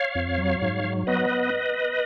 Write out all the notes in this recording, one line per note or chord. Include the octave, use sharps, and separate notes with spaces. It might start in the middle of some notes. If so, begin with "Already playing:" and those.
Already playing: C#5 F5
F2
F#3
G#2
F#3
B3 B4 D#5